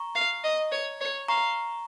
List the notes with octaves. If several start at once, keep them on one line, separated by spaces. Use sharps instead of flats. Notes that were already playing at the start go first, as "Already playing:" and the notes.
Already playing: A#5 C#6
F5
D#5
C#5
C#5
F5 A#5 C#6